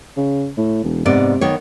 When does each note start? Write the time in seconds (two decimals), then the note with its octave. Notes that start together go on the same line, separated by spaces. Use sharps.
0.17 C#3
0.57 A2
0.84 E1
1.05 G#2 C3 B3 D5
1.41 D#3 B3 C#5